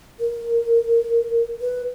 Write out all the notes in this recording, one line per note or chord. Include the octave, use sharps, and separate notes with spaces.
A#4
B4